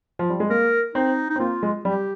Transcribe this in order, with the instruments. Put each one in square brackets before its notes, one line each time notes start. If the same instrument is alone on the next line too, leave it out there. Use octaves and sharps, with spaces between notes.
[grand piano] F3
G3
G#3
[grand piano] A#3 [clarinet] A#4
[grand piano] C4 [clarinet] D#4
[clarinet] D#4
[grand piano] C4
[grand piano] A#3 [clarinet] F4
[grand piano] G#3
[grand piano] G3 [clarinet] G4